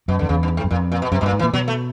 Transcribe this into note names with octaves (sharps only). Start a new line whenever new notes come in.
F#2 B2
F2 D3
E2 C#3
G2
G#2
F#2
F2 A#2
A#2
B2
F#2 C3
G2 B2
A#2
G#2
E3
A#2
B2 F#3
A3